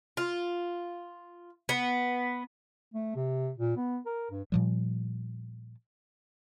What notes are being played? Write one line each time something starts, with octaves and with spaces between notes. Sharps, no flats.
F4
B3
A3
C3
A#2
B3
A#4
G2
A#2 F3 G3